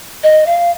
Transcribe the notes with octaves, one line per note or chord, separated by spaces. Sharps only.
D#5
F5